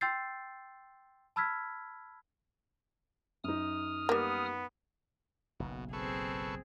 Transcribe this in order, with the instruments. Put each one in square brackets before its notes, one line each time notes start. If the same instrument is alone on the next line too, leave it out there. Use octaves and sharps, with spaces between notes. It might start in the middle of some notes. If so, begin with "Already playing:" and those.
[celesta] G5 C6 E6 G6 A6 C7
A5 B5 E6 F6 G#6 B6
[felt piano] F#2 D#4 [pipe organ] D#6 F6
[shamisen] G3 A#3 [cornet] B3
[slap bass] F#1 B1 [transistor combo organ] B2
[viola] C4 G#4 [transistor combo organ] A4 B4 C#6